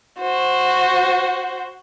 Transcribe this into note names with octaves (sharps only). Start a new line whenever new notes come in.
F#4 C5